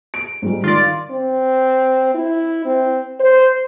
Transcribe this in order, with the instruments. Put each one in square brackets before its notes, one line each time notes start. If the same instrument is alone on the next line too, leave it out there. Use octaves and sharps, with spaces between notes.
[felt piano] D7
G#2 G3 G#3
[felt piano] D#3 [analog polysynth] F4 D5
[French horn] C4
E4
C4
C5